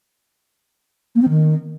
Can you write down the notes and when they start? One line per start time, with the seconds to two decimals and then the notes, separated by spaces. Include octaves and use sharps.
1.15 A#3
1.22 C4
1.28 D#3